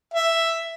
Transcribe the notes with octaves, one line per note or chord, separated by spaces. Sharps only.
E5